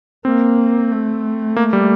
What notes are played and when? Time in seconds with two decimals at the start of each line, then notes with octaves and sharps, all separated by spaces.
0.25 A#3 C4
0.91 A3
1.56 A#3
1.73 G3